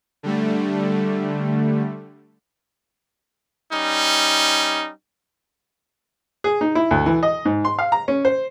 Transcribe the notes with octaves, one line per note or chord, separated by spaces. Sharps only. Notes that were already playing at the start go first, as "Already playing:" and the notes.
D3 G3 A3
G3 C#4 D#4
G#4
D#4
E4
D2
E3
D#5
G#2
C6
F5
A#5
C#4
C5